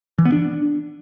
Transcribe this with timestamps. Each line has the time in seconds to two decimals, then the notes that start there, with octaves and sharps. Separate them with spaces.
0.19 E3
0.25 B3
0.32 D4